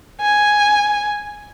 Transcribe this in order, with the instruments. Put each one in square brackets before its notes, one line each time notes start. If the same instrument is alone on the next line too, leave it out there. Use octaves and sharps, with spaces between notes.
[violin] G#5